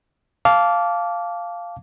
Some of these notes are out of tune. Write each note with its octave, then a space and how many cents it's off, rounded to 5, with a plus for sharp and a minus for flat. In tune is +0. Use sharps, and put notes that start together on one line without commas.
F5 +0 A5 -15 D6 -20